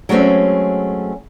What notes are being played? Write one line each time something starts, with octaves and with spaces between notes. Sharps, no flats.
F#3 G#3 A3 C4 C#4